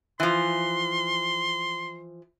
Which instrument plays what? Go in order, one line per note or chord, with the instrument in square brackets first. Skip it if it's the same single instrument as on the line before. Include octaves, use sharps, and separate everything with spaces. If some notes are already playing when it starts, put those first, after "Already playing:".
[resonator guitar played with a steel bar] E3 F3 [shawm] C6